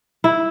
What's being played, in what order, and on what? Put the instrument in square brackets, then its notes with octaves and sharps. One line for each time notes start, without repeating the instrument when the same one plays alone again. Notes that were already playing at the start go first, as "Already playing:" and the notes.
[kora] E4